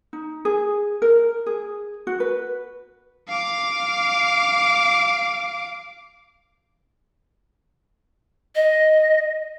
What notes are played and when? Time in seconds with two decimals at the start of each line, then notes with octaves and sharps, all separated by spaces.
0.13 D#4
0.45 G#4
1.02 A#4
1.46 G#4
2.07 F#4
2.20 B4
3.29 F5 D6
8.56 D#5